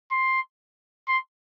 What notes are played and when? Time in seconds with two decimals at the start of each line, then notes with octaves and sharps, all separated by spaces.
0.12 C6
1.08 C6